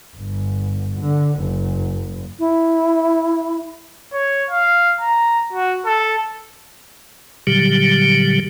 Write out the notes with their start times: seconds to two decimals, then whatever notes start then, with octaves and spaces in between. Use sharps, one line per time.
0.16 G1
1.00 D3
1.39 F#1
2.39 E4
4.13 C#5
4.51 F5
5.01 A#5
5.53 F#4
5.86 A4
7.47 A#2 D3 F#3 G3 G4